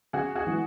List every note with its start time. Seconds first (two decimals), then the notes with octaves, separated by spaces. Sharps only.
0.13 C#3 F#4 G#4
0.35 F#4 G#4
0.46 E3 G#3